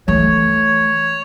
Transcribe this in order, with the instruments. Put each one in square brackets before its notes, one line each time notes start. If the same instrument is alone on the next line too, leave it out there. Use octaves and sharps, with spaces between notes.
[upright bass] E3 A3 [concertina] C#5